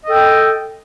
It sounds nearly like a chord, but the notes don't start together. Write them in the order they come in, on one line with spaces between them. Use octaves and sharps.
D#5 A4 G5